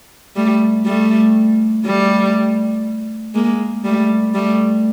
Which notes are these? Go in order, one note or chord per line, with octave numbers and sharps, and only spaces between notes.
G3 A3
G3 A3
G3 A3
G#3 A#3
G3 A3
G3 A3